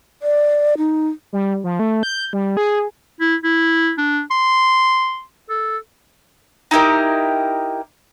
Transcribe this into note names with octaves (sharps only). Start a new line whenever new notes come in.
D5
D#4
G3
F3
A3
G6
G3
G#4
E4
E4
D4
C6
A4
D#4 E4 G4 A#4